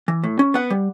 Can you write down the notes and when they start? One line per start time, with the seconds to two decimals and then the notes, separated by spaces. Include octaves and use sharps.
0.08 E3
0.24 A2
0.39 C#4
0.54 B3 F#5
0.70 G3